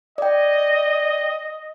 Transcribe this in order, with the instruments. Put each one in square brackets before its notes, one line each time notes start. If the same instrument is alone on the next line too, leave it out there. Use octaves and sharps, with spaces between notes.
[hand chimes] D5 G5 [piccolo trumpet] D#5